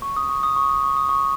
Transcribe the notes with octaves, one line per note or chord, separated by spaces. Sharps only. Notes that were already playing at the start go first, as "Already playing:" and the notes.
C#6
D#6
C#6
D#6
C#6
D#6
C#6
D#6
C#6